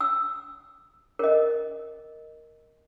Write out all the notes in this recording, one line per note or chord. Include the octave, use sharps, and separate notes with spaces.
E6
A#4 D#5